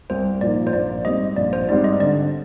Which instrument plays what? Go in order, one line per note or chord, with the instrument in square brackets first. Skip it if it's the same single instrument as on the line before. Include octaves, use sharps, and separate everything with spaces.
[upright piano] C2 [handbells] C5
[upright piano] A#2 F3 A#3 D#4 [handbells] D5
[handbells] C5
[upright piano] A#1 [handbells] D5
[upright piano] G#2 G3 C4 [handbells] D#5
[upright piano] A#1 [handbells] D5
[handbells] C5
[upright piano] G#2 G3 C4 [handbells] D5
[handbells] D#5
[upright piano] D3 [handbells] D5